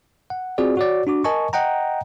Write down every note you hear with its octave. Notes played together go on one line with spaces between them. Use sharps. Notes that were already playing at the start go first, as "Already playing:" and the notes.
F#5
C4 F4 F#4 G#4 D5
F#4 C#5 D5
D4 F#4 D6
A#4 D#5 G#5 A5 C#6
D#5 F#5 G5 A#5